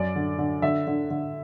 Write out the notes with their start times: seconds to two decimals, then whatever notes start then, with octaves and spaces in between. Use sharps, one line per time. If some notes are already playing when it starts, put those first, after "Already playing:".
Already playing: F#2 D5
0.16 D3
0.39 D3
0.62 D3 E5
0.87 D3
1.10 D3